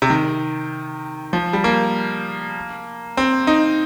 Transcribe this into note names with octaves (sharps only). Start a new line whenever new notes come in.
C3
D#3
F3
G3
A#3
C4
D#4